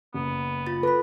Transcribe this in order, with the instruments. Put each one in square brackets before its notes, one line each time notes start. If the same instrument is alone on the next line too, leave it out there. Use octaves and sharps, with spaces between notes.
[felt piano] F#1 [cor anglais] B3
[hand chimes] F4 B5 A6
[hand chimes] A4 B5 [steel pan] B4